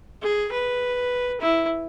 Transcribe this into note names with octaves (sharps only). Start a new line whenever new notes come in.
G#4
B4
E4